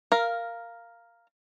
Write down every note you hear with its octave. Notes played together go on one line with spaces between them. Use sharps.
A#4 F5